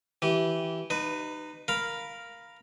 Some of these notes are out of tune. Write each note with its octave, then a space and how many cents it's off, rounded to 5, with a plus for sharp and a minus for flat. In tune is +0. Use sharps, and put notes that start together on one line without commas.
E3 -5 G4 -25
D#4 -20 B4 +15
A#4 +0 F5 +0 B5 +0